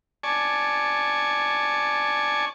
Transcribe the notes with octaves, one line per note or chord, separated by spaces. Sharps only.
D5 G#5 A5 C#6